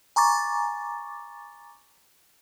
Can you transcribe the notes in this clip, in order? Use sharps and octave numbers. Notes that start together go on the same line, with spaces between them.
G#5 A#5 C#6 D6 A6